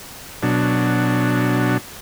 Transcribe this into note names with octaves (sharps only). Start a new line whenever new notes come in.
B2 F#3 D4